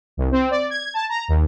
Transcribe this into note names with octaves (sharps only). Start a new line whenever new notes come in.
C2
C4
D5
G#6
A5
A#5
D#2